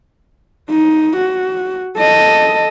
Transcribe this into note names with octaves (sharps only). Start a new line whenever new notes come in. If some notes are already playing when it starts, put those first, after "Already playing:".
D#4
F#4
A4 D#5